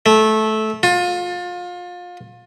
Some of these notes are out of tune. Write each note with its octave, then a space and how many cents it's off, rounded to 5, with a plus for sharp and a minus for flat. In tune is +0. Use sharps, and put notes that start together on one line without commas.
A3 -15
F4 +30